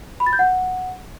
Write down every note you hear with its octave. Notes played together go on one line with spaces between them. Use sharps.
B5
A6
G6
F#5